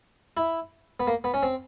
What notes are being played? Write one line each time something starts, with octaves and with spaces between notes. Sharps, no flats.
E4
B3
A#3
B3
C#4
C4